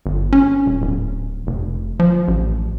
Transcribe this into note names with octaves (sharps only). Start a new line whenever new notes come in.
G1
C#4
D#1
D1
F1
F3
A1